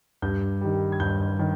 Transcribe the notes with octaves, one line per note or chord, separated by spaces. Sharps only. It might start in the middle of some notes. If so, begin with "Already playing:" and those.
G2 G6
D#3 G3
G#6
G2 G6
D#3